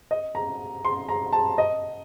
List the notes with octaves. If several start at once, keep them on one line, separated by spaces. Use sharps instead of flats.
D#5
A#5
C6
A#5
A5
D#5